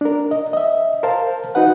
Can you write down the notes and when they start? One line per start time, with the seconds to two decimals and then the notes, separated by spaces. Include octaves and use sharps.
0.01 D4 A#4
0.31 D#5
0.53 D#5 E5
1.03 A#4 C5 F5 A5
1.55 D#4 F#4 B4 F#5